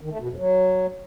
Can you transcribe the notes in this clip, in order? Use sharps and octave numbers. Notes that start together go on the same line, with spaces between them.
D#3
A3
B2
F2
F#3